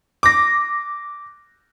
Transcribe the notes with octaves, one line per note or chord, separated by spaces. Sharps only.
D6 A#6